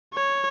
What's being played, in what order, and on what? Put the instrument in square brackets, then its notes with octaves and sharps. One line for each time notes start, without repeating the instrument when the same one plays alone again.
[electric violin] C#5